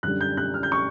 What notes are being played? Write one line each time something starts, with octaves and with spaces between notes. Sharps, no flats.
F#2 D3 G3 F#6
G6
F#6
F6
G6
C#6